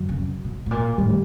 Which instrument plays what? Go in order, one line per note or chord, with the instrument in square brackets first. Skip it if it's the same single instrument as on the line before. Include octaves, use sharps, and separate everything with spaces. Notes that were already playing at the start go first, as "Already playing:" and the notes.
Already playing: [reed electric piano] F#2 D3 F#3
[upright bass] C#3
B2
A2
A#2
[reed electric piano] F#2 D#3 G3 [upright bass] A2